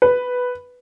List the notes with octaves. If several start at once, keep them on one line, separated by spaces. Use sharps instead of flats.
B4